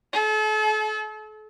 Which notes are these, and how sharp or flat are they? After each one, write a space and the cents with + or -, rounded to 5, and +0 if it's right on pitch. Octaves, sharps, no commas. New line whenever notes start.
A4 -40